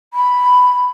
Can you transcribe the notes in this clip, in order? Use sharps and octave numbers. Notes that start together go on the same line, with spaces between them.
B5